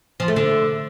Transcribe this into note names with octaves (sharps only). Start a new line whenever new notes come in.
F3
A3
D3